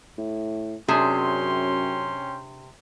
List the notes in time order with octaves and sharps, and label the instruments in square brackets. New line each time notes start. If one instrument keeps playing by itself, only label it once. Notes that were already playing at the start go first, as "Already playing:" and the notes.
[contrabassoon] A2
[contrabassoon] F#2 [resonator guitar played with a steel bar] C3 [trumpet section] C#4 G5 C6 [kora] D4 G#4